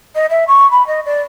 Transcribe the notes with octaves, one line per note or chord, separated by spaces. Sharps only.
D#5
E5
C#6
B5
D#5
D5